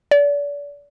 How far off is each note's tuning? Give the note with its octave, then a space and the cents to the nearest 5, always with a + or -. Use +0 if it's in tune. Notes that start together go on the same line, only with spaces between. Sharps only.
D5 -35